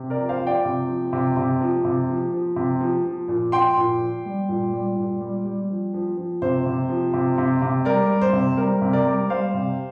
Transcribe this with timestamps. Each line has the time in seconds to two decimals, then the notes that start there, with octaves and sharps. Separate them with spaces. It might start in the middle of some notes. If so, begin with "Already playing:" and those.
Already playing: C3
0.10 A#4 D5
0.17 F3
0.29 C5 F5
0.40 F3
0.47 D5 G5
0.65 C3
0.88 F3
1.13 C3
1.37 C3
1.61 F3
1.85 C3
2.09 F3
2.33 F3
2.56 C3
2.81 F3
3.05 F3
3.28 A#2
3.52 F3 G5 C6
3.77 A#2
4.01 F3
4.26 G3
4.49 A#2
4.73 G3
4.97 A#2
5.21 G3
5.45 G3
5.69 F3
5.94 F3
6.17 F3
6.42 C3 C5
6.66 C3
6.89 F3
7.13 C3
7.38 C3
7.62 C3
7.85 G3 A#4 D5
8.09 G3
8.21 C5
8.33 C3
8.57 G3 A#4
8.81 C3
8.93 A#4 D5
9.05 G3
9.29 G3 C5 F5
9.54 C3